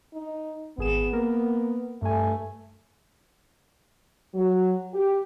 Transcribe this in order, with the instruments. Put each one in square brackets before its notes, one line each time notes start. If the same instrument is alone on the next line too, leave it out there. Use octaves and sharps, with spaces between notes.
[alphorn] D#4
[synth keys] G#1 G#4 E7 [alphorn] B3
[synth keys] A#3 A#4
[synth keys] G2 G#5 [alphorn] A3
[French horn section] F#3
G4